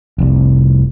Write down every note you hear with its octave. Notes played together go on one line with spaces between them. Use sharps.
F1 C2